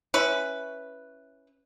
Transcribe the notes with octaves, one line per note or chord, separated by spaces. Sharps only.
C#4 E4 B4